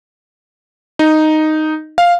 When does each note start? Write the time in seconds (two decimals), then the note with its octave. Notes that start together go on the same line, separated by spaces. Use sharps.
0.99 D#4
1.98 F5